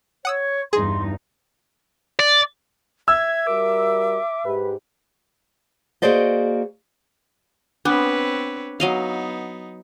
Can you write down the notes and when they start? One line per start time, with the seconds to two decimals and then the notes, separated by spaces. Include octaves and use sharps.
0.25 C#5 F#5 D#6 E6
0.73 E2 G2 D#4 G#4 C6
2.20 D5
3.08 E5 E6 G#6
3.47 G3 F#4 A#4 D6
4.45 G#2 G4 B4
6.02 A#3 F#4 G#4 C5 D5 D#5
7.85 B3 C4 D4 B4 C#5 D6 F#6
8.80 F#3 B3 D#4 D#5 F5